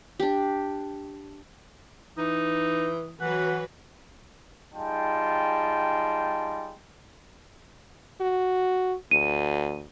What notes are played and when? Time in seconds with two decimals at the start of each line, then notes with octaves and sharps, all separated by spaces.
0.20 D4 G4
2.18 E3 D#4 D#6
3.21 E3 F#3 F#4 B4 F#5
4.74 G3 D#4 F4 G#4 G5 A5
8.21 F#4
9.11 D2 D#7